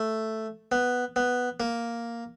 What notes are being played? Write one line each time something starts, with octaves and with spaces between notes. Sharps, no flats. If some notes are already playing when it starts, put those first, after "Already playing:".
Already playing: A3
B3
B3
A#3